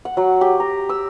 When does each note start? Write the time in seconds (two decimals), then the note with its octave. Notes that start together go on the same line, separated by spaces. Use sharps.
0.05 F#5
0.17 F#3
0.41 G4
0.60 A#5
0.89 E6